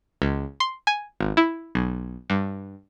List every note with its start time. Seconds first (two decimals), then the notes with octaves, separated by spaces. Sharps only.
0.22 C#2
0.60 C6
0.87 G#5
1.20 G#1
1.37 E4
1.75 B1
2.30 G2